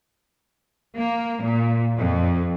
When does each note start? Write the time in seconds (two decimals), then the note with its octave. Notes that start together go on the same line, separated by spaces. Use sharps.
0.96 A#3
1.43 A#2
1.97 F2